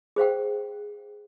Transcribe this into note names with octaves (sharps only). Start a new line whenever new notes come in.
G#4 C5 F5 G5